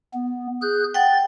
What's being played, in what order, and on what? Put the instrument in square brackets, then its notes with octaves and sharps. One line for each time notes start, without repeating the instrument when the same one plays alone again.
[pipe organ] B3
G#4 F#6 G6
[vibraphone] F#5 G5 [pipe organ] A6